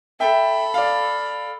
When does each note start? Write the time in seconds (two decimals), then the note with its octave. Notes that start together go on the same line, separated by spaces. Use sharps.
0.20 A4 E5 G5 B5
0.74 D5 F5